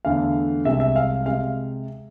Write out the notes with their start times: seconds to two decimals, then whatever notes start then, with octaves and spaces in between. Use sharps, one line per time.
0.05 E2 D3 A3 F5
0.65 C2 C3 G#3 E5
0.80 E5
0.96 F5
1.26 C3 G#3 F5